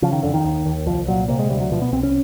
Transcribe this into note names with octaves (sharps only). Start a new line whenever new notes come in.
C#3 F3
D#3
F2 D3
D#3
D#2
D#2
C2 F3
A#2 F#3
C3 A#3
G#3
D2 G3
F#3
B2 F3
B3
C2 C4
C#4